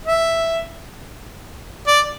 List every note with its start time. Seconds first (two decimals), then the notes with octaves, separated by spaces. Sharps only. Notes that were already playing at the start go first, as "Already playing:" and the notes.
0.05 E5
1.87 D5